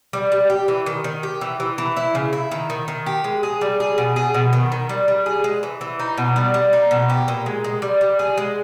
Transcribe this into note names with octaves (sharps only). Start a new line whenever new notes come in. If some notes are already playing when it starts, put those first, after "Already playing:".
G3
G3
G4
E3
D#3
D#3
G4
E3
E3
E3
E4
C#3
E4
D#3
D#3
D#3
G4
G#3
G#4
G3
G#4
B2
G#4
B2
D#3
D#3
G3
G3
G#4
G#3
E3
E3
D#4
B2
G3
G3
D#4
B2
G4
A#2
G#3
G#3
G3
G3
G#4
G#3